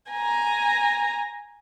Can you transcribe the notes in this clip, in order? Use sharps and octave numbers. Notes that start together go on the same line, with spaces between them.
G#5 A#5